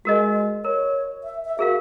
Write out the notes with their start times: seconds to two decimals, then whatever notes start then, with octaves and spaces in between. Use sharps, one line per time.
0.05 G#3 F#4 A#4 D#5
0.65 A#4 C#5
1.24 E5
1.45 E5
1.59 F#4 G#4 A#4 F5